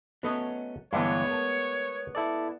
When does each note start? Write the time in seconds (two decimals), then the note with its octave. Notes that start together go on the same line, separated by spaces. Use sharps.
0.23 F#3 A3 B3 C#4 A4 D#5
0.93 G2 D3 E3 G#3 A3 B3 C#5
1.29 A#4 A5 A#5
2.15 E4 A4 D5